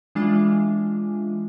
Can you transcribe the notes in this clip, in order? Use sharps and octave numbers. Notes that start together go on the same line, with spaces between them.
E3 G#3 D4 F4